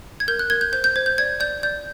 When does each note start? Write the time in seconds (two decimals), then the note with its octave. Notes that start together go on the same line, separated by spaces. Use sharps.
0.20 G#6
0.28 A#4 G6
0.39 F#6
0.50 A#4 G#6
0.61 G6
0.73 C5 G6
0.84 G6
0.96 C5 G#6
1.06 G6
1.18 D5 G#6
1.40 D5 G6
1.63 D5 G6